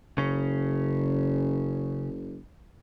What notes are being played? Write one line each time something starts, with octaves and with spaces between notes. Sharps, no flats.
F#1 C#3 C#4